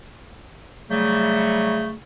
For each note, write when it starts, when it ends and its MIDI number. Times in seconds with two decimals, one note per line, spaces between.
0.90 1.94 49
0.90 1.94 54
0.90 1.94 55
0.90 1.94 57